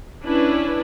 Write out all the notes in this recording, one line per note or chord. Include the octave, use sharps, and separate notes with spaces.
C#4 D4 E4 B4